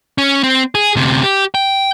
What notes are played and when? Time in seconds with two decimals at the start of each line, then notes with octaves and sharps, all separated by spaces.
0.18 C#4
0.43 C4
0.75 G#4
0.96 D2 C3
1.24 G4
1.55 G5